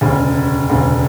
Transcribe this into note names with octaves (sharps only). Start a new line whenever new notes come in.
E1 D2 C#3
E1 D2 C#3